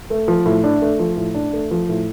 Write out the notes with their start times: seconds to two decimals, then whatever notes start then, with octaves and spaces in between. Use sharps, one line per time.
0.10 A3
0.28 F3
0.46 A2
0.64 D4
0.82 A3
0.99 F3
1.17 A2
1.35 D4
1.53 A3
1.71 F3
1.89 A2